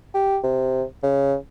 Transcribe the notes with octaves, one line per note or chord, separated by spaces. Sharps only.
G4
C3
C#3